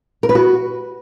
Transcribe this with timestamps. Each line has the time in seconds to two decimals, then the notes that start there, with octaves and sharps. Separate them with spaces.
0.23 A#4
0.29 B4
0.35 F#4